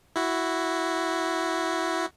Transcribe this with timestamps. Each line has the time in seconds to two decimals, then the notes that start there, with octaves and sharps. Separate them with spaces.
0.16 E4 F#4